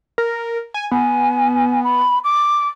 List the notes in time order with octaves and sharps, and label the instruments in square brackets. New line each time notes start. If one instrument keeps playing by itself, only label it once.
[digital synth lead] A#4
G#5
[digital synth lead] B3 [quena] G#5
[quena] B5
D6